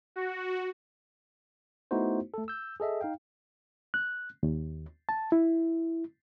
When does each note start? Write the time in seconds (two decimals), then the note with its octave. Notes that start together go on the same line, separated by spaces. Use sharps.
0.16 F#4
1.91 A3 B3 D#4 E4 F#4 C5
2.34 A3 A4
2.48 E6 G6
2.80 G#4 A4 D#5 E5
3.01 D#4 F5 G5
3.94 F#6
4.43 D#2
5.09 A5
5.32 E4